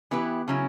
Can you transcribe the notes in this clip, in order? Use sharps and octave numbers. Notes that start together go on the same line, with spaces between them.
E3 B3 E4 G4 B4
C#3 F#3 C#4 E4